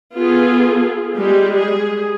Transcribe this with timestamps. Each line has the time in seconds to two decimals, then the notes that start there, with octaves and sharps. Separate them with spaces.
0.15 B3 F4 G#4 A4
1.16 G3 G#3 G4
1.58 G#4